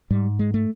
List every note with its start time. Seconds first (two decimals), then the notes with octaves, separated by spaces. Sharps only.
0.10 G#2 G3
0.39 G#3
0.54 A3